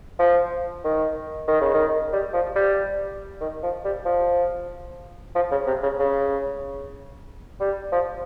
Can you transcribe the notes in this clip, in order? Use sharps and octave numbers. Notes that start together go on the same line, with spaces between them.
F3
D#3
D#3
C#3
D#3
G3
F3
G3
D#3
F3
G3
F3
F3
C#3
C3
C#3
C#3
G3
F3